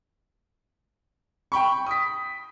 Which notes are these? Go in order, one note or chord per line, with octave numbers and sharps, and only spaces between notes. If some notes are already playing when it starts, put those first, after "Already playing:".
G5 B5 C#6
D#6 B6